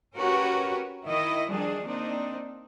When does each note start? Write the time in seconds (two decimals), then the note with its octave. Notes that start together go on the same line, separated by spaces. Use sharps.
0.16 C#4 F#4 G4 A#4 B4 C#5
1.05 D#3 E4 D#5
1.50 D#3 F3 G3 D4 G#4
1.85 A#3 C4 D4 D#4